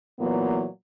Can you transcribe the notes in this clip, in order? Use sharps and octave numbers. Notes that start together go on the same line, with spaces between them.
A#2 E3 F#3 A#3 B3